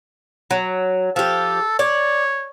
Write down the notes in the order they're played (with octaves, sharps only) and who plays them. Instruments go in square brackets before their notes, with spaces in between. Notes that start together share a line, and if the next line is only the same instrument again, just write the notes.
[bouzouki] F#3
[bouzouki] F3 G4 [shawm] A4
[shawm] C#5 [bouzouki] D5